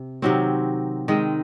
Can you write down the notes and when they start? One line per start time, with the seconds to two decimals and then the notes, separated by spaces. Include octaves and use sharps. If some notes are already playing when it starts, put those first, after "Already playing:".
Already playing: C3
0.22 C3 D#3 F#3 C4
1.08 D#3 G#3 C4